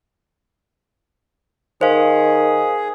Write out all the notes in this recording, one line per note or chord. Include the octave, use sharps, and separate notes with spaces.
D#3 G#4 C5 F5